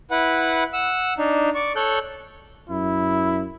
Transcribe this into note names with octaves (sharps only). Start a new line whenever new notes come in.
E4 B4 F#5
F#5 E6
D4 D#4
D5 C#6
A4 C#5 F#6 G6
F#2 E4